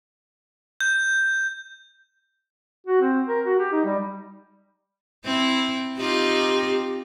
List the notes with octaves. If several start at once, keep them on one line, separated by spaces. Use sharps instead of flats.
G6
F#4
C4
A#4
F#4
G4
D#4
G3
C4 E4
C4 D#4 F4 G4